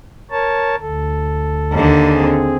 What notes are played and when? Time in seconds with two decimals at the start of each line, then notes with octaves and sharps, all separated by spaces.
0.31 A#4 C#5 A5
0.81 D2 A4
1.73 D#2 D3
2.13 C4 G#4